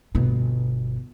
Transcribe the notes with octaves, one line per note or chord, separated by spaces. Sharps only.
G1 B2